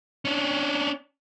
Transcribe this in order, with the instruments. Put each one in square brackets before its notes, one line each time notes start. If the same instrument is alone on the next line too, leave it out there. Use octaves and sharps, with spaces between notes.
[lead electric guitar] C#4 D4